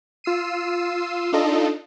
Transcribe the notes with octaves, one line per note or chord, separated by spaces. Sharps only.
F4 E6 C7 D#7
D4 D#4 F4 A4 D#5